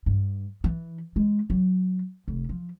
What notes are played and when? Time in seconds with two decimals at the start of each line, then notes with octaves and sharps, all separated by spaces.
0.06 G2
0.64 E3
1.16 G#3
1.50 F#3
2.28 F1
2.49 F3